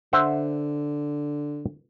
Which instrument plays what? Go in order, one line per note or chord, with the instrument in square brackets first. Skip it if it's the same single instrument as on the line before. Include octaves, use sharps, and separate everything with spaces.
[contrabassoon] D3 [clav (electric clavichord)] C5 E5 F#5